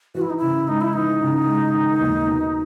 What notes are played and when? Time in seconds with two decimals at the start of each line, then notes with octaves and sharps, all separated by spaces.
0.15 E3 F#4
0.21 E4
0.30 D#4
0.37 C#3 E4
0.68 G#3 D#4
0.81 E4
0.93 E3 D#4
1.21 C#3
1.47 G#3
1.74 D#3
2.01 D#2
2.27 B2